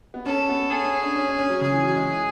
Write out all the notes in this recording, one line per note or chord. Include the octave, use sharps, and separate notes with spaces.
B3
C#4 A4
B3
C#4 G#4
C#4
D4
C#4
C#4
C#4
F#3
C#3 G#4
E3
F#3
G#3